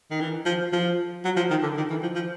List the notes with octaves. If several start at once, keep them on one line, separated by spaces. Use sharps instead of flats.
D#3
E3
F3
F3
F#3
F3
D#3
D3
D#3
E3
F3
F3